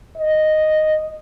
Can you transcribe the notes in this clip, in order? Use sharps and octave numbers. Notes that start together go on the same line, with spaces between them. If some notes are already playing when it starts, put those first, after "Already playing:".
D#5